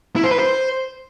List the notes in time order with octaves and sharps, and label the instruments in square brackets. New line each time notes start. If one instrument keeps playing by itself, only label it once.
[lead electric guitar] E4
C5
B4
C5